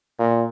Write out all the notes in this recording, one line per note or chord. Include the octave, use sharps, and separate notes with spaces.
A#2